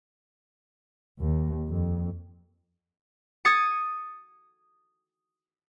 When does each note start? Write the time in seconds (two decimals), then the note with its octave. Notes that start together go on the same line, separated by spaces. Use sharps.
1.20 D#2
1.67 F2
3.45 D#6 G#6 A6 C#7